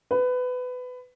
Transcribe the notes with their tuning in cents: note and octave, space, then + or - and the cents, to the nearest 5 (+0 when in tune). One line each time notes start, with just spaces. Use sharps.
B4 +20